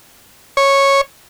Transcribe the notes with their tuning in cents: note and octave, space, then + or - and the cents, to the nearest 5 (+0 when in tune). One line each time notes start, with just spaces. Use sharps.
C#5 -10